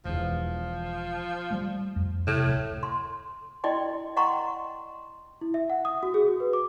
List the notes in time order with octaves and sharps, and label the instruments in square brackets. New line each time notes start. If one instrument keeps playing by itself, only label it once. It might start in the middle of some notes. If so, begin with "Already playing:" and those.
[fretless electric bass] E1 E2 [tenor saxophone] F3
[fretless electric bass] G3 A3
F2
[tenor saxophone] A2 [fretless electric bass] C3
[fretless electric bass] D1
[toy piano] C6
E4 D5 D#5 G5 C6
D#5 F#5 G5 A#5 C6 C#6
[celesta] E4
E5
F#5
D#6
F#4
G#4
F#4
B4
D6